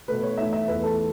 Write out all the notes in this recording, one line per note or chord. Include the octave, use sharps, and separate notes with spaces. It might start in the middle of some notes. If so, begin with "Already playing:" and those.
B2 A3 B4
C#5
A2 E3 A3 E5
E5
E2 E3 A3 B4
A4